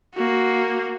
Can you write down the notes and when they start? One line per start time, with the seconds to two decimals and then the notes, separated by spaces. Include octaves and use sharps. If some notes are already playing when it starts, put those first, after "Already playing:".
0.15 A#3 F#4